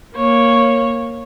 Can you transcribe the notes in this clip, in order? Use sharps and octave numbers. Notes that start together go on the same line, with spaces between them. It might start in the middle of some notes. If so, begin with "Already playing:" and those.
A#3 C#5